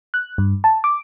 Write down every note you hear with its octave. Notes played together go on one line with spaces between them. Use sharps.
F#6
G2
A5
D6